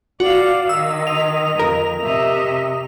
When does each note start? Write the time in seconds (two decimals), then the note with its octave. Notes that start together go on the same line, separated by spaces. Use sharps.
0.20 F#4 D5 F5
0.69 D#3 D#5 E6
1.07 F7
1.59 F2 A#4
2.02 C3 D#5 E5